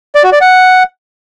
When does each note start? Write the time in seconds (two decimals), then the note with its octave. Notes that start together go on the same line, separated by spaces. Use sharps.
0.15 D5
0.24 F#4
0.32 D5
0.41 F#5